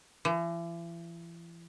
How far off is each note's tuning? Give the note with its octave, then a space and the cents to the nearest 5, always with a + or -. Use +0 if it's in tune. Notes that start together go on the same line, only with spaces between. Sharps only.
E3 +40